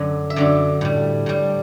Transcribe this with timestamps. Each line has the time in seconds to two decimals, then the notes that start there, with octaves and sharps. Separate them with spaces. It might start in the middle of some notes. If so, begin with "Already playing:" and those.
Already playing: F#2 D3 F#3
0.30 E5
0.36 F#2 D3 F#3 D5
0.81 A2 G3
1.26 A2 G3